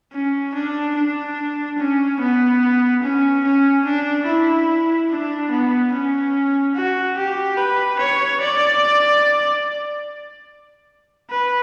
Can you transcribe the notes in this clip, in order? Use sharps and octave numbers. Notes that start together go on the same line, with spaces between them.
C#4
D4
D4
C#4
B3
C#4
C#4
D4
E4
D4
B3
C#4
F#4
G4
B4
C#5
D5
B4